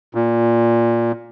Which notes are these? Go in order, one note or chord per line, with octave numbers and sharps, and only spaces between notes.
A#2